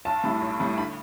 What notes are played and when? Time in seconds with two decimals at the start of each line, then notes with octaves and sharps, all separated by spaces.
0.05 B1 A5
0.24 A2 G3 E4
0.41 B1
0.60 A2 G3 E4
0.78 D3 B5